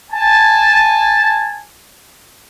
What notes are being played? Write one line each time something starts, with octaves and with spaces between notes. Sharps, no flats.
G#5 A5